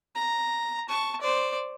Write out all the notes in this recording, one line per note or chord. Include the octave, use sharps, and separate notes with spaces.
A#5
A5 C#6
C5 D5